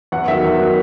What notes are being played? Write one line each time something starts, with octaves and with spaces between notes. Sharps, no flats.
E2 F#5
D#3 F#3 E5
E2
D#3 F#3